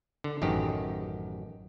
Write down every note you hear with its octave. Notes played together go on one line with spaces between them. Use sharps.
D3
A1 F#2 D#3 G4